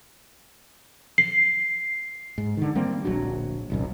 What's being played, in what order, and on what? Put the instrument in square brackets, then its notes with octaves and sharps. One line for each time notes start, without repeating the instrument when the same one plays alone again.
[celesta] C7
[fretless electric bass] G#2
D3 D#3
G3 A#3 C4
D1 A#1 F#3 D4
D#1 C2 F#2